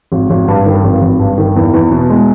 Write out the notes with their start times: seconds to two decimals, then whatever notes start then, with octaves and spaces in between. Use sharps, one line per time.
0.12 G#1
0.30 G#1
0.48 G2
0.66 D#3
0.84 G#1
1.02 G#1
1.19 G2
1.38 D#3
1.56 E2
1.73 E2
1.92 B2
2.10 G#3